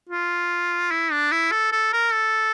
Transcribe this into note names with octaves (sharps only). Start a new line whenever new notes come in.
F4
E4
D4
E4
A4
A4
A#4
A4